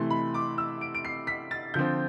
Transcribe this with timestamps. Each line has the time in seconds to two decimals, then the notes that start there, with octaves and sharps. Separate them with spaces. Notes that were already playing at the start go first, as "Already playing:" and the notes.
Already playing: C3 E3 A3 C6
0.10 B5
0.34 D6
0.58 E6
0.81 D7
0.95 D7
1.05 C7
1.27 B6
1.51 A6
1.74 D3 F3 C4 G6